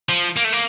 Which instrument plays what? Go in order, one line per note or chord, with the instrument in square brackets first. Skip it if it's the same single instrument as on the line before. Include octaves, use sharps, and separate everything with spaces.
[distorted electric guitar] F3
A#3
A3
A#3